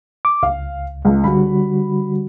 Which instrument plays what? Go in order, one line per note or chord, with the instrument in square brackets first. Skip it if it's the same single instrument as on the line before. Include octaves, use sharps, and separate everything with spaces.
[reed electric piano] D6
[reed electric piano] C#2 [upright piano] F5
[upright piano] C#2
[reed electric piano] D3 G3 F#4 [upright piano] B5